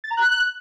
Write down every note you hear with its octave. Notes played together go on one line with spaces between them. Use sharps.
A6
A#5
F#6